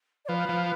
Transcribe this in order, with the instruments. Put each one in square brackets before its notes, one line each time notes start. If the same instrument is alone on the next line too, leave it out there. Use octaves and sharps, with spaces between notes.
[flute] D5
[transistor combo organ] F3 [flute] B4
[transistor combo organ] F3